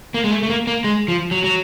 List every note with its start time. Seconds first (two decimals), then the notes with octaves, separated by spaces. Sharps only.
0.14 A#3
0.24 G#3
0.31 A3
0.43 A3
0.50 A#3
0.67 A#3
0.84 G#3
1.08 F3
1.31 F#3
1.44 F#3